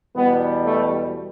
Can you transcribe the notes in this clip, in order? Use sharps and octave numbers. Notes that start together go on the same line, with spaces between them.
E2 B2 G3 B3
A3